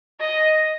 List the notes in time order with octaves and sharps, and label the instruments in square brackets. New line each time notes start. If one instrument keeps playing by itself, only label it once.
[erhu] D#5